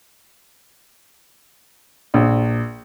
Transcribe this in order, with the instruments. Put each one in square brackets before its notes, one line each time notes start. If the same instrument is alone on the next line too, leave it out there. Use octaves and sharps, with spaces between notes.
[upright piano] A#1